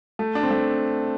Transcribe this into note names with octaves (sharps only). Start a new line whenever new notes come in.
A3
D4
C4
A3